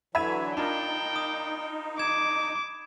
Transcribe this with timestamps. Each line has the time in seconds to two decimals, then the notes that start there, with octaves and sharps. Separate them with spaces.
0.15 D3 E3 F#3 E5 B5 G#6 D#7
0.57 D4 D#4 F4 A#4 G5
1.16 D#6
1.99 D6 G#6 E7